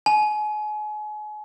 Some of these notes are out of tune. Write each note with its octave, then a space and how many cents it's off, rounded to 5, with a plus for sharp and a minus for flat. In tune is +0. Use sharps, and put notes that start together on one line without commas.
G#5 +35